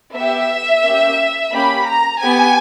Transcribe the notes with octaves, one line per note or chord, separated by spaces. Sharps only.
B3 G4 E5
A#3 C#4 G4
A#3 C#4 G4 B5
A#5
B3 G4 G#5